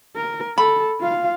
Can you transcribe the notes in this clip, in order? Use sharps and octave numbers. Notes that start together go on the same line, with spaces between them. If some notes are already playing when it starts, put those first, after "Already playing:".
A#4
A4 B5
F4 F5